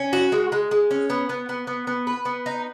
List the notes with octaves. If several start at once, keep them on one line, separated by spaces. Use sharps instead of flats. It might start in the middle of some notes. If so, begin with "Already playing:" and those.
Already playing: C#4
F#4
G#3
G#3
G#3
C#4
B3
B3
B3
B3
B3
B4
B3
D#4